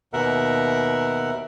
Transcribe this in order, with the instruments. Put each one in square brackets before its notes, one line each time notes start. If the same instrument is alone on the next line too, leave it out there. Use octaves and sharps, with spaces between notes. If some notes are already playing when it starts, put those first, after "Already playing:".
[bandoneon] D#2 B2 A#4 E5 F#5